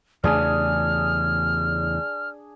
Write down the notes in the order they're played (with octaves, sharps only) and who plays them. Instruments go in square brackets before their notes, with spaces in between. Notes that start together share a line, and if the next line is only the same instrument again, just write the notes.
[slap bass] E2 C#3 A3 [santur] D4 G#4 G#5 [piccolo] F6